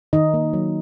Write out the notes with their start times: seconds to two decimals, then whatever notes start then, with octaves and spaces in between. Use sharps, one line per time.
0.13 D#3 D#4 D#5
0.34 A#3
0.53 F#3